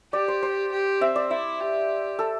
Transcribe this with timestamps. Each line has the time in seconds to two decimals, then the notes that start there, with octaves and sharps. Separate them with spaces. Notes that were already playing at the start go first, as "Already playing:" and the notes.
0.13 G4 D5
0.28 C5
0.43 C5
0.72 G4
1.01 C4 E5
1.16 D5
1.31 E4 E5
1.60 G4
2.19 A4